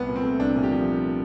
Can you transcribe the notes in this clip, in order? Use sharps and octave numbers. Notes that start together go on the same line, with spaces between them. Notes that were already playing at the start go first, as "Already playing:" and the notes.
Already playing: C2 B3
A#2
C4
A3
C2 D4
A#2
G4
F3